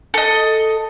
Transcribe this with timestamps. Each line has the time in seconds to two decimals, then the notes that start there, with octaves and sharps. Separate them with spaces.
0.14 A4 D#5